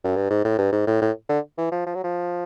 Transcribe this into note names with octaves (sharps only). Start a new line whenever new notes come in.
F#2
G2
G#2
A2
G2
G#2
A2
A2
D3
E3
F3
F3
F#3
F3